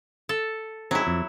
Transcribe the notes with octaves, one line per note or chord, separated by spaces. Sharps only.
A4
F#3 C4 D#4 E4 G#4
F2